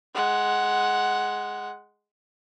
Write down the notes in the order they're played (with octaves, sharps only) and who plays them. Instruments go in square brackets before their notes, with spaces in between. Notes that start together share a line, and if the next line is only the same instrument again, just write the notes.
[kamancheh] G#3 F#5